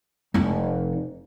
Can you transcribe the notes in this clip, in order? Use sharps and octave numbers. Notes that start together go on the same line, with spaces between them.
F1 D#4